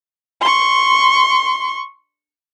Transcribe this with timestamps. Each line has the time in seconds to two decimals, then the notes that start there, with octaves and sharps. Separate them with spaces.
0.41 C6 C#6